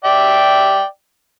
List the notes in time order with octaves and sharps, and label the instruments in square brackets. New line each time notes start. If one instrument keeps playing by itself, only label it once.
[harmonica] D5 E5 G5